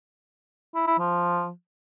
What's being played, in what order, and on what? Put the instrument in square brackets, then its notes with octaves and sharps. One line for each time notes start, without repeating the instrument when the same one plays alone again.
[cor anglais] E4
E4
F3